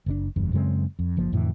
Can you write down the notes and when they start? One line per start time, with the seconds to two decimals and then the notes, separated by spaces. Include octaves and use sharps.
0.06 F#1 A#2 D4
0.36 F#1 E2 G2
0.53 F#2 C#3 G#3 C4
0.99 F2
1.17 F#1 F3 A#3
1.32 F2 A2 D3 E3